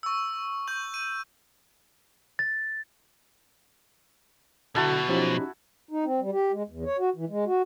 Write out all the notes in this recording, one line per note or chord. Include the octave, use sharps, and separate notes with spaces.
C#6 E6
C#6 G6 F#7
D#7
A6
B1 B2 D3 E4 F#4 A5
F3 C#4 D#4 G4
D#4
C4
G3
G4
G#3
E2
C#5
F#4
E3
G#3
F#4